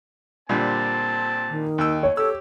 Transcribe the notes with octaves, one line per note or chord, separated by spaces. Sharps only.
A#2 D3 G3 C4 A5
D#3
D#2 G5 E6
C#5
G4 A4 E6